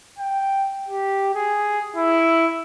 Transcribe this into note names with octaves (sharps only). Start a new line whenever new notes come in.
G5
G4
G#4
E4